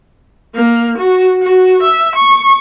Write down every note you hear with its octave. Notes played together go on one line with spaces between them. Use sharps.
A#3
F#4
F#4
E5
C#6